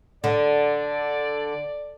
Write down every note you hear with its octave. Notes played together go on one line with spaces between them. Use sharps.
D3 D5